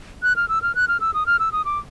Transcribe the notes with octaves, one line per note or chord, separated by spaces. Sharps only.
F#6
F6
E6
F6
F#6
F6
E6
D#6
F6
E6
D#6
D6